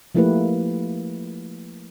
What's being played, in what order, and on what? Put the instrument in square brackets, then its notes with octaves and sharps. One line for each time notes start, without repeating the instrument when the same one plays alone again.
[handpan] F3 A3 A#3 E4 G4 B4